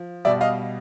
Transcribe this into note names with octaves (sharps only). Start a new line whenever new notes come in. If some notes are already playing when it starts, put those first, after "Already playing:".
Already playing: F3
B2 G3 D5 E5
D#5 F5